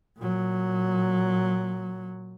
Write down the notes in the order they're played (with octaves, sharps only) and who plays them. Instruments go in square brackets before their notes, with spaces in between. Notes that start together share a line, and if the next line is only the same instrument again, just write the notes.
[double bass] A#2 F#3